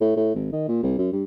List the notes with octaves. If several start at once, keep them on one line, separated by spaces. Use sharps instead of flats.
A2
A2
G#1
D#3
A#2
C2
F#2
G2